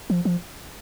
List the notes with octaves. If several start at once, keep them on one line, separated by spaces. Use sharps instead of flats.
F3
F3